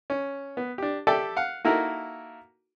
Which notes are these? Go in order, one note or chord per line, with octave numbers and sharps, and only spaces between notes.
C#4
B3
D4 G4
G4 A4 D5 E5 G5 A5
F5 F#5
A#3 D#4 E4 F#4 A4 A#4